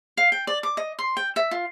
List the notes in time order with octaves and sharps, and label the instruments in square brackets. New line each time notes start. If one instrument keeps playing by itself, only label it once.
[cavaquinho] F5
G5
D5
D6
D#5
C6
G5
E5
F4